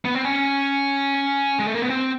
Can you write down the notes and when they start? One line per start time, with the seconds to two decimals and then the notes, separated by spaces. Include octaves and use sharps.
0.05 B3
0.15 C4
0.25 C#4
1.59 G#3
1.67 A3
1.74 A#3
1.82 B3
1.90 C4